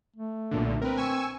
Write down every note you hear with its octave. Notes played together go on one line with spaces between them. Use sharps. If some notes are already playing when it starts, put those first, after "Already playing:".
A3
B1 A#2 D3
C4 A#4 B4
G#5 C#6 E6